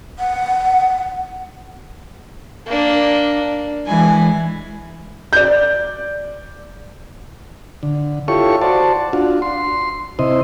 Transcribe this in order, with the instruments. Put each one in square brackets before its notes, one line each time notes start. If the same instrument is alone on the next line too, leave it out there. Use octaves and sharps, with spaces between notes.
[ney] F#5
[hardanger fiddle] A#3 D4
[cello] E3 G#3 [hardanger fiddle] G#5
[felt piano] D5 G6
[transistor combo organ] D3
E4 F4 G4 A4 C#5 C#6
F#4 C5 D5 A5
D4 F4 F#4
C6
C3 E4 C5 D#5